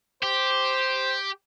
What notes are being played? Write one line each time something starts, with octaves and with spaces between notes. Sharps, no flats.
G4 C5